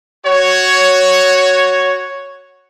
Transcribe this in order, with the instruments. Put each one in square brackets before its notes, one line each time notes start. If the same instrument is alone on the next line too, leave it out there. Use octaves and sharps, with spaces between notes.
[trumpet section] F#4 C#5